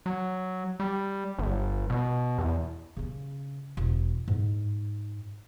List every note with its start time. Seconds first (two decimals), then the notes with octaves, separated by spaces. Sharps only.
0.06 F#3
0.80 G3
1.39 G1
1.90 B2
2.38 E2
2.97 C#3 C#4
3.77 E1
4.28 G#2